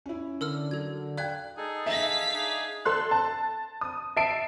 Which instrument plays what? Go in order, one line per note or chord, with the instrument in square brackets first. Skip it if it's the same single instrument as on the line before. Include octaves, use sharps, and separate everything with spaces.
[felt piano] C#4 E4
[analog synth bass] D3 [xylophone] A#4 E6 F6
[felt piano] F#3 [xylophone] A4 G#6
[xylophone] D5 F5 G#6 [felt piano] G5 F#6
[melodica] D#4 A4 [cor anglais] G#4
[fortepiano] E5 [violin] F5 B6
[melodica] D4 D#4 [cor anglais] G#4
[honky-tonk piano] A4 C6 F#6
A5
D#6
E5 A5 C7 D7